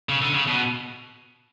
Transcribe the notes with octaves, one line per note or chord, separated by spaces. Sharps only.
C#3
D3
C#3
B2